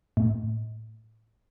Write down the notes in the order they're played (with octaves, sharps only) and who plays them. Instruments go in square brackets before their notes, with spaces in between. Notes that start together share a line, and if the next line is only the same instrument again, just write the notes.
[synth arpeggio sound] A2